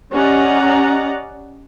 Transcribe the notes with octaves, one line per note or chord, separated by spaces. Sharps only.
C#4 G4 D5 D#5 F#5 A#5